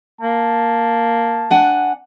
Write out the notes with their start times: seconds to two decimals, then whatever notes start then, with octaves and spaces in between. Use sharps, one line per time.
0.21 A#3 A5
1.50 D4 F#5 G#5